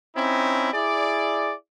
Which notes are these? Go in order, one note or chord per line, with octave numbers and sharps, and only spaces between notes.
C4 C#4 D#4 E4
E4 G#4 D5